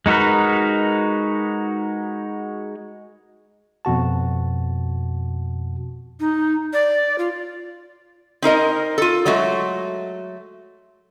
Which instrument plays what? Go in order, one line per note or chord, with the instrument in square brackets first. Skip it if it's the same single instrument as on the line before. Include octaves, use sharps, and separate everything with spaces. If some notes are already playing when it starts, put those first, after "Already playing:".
[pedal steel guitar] G#3 D#4 F#4 A#4 B4
[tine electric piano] F2 B2 F#4 A5
[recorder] D#4
D5
F4
[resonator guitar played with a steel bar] C4 D#4 A#4 D#5
F4 A4
F#3 G#3 A3 F#4